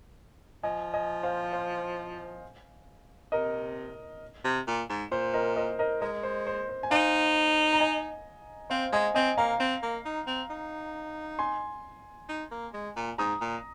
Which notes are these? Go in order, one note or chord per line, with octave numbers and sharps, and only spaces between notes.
F3 D#5 G#5
D#5 G#5
C5 F5
C5 F5
C3 A#4 D#5
C3
A#2
G#2
A#2 C5
A#4 D#5
A#4 D#5
A#4 D#5
G#3 A#4 D#5
C5
C5
C5
G#5
D#4 C5 F5
A#5
D#5 G#5
C4 C5 F5
G#3 D#5 G#5
C4 D#5 G#5
A#3 F5 A#5
C4
A#3
D#4
C4
D#4
G#5 C6
D#4
A#3
G#3
A#2
G#2 A#5 D#6
A#2